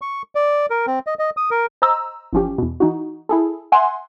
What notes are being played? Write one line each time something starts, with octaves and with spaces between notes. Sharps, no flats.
C#6
D5
A#4
C4
D#5
D#5
D#6
A#4
C5 D#5 A#5 E6
G1 E3 F3 C#4 G4
E2 B2
E3 D#4 F#4
E4 G#4 A4
E5 F#5 G#5 C6